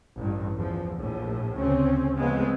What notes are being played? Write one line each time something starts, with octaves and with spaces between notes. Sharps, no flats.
A1 G2
E2 F3
A#1 A2
D2 C#3 A3 C4 C#4
C#3 F3 G#3 A3 B3 C4